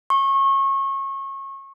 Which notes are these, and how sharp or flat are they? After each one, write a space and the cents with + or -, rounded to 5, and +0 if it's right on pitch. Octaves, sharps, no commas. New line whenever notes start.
C#6 -30